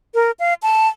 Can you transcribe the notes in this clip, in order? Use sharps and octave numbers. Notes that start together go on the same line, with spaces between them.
A#4
F5
A5